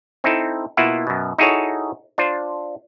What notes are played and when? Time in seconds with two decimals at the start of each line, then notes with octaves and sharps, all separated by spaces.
0.24 C4 D#4 E4 A4
0.77 B2 A#3 E4 F4 E5 F#5
1.07 F#2 B2
1.38 D#4 E4 F#4 G#4 A4 C#5
2.18 D4 F4 C5